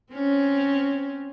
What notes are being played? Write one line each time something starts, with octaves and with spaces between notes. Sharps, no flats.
C4 C#4